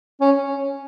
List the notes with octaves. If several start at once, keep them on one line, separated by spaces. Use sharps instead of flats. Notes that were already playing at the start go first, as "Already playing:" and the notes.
C#4